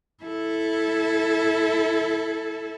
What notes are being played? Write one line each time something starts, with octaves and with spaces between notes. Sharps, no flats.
E4 A4